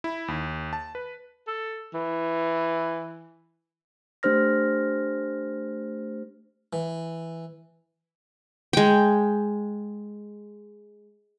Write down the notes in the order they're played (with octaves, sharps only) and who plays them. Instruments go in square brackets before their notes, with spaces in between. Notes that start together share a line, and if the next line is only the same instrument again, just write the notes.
[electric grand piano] E4
D#2
A5
B4
[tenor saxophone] A4
E3
[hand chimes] A3 D4 G4 C5 F6 A#6
[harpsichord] E3
[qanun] G#3 G5